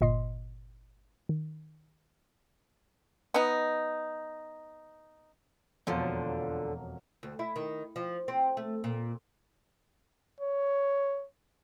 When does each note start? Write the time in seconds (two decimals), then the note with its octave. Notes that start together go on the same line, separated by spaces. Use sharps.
0.01 G1 A#2 D#5 C6 C7
1.29 D#3
3.34 B3 D#4
5.87 E1 F2 D3 F3 F#3 A#3
7.23 D2
7.39 E4
7.56 D#3
7.96 F3
8.28 C4
8.57 A3
8.84 A#2
10.40 C#5